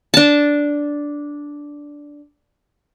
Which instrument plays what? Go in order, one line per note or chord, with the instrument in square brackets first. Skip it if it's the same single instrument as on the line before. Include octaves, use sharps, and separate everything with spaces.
[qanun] D4 A5